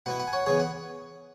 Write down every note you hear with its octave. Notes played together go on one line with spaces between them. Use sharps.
B2 B3 E4 F#5 B5
F#5 B5
G#5
C#5 F#5
C#3 E3 B3 G#4 C#5
F#5 B5